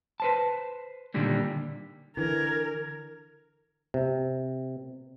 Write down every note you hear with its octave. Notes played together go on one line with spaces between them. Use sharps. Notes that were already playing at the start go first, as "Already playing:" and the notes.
B4 C5 A5
A#2 D3 D#3 G3 A#3
D3 E3 A#4 G#6
C3